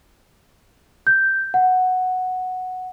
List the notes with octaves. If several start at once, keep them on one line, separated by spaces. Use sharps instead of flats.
G6
F#5